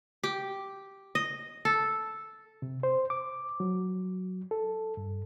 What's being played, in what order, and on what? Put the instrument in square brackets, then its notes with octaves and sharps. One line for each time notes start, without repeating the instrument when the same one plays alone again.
[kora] G4
D#5
A4
[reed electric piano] C3
C5
D6
F#3
A4
G2